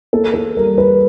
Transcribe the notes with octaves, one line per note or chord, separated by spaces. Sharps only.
A#3 A4
A4
G3 A#4
B4